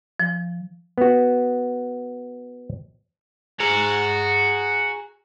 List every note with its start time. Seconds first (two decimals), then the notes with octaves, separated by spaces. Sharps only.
0.20 F3
0.98 B3 F#4
3.60 F#4 G#4 A#5